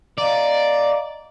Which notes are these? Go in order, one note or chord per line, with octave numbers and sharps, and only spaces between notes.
D5 D#5 F5 A#5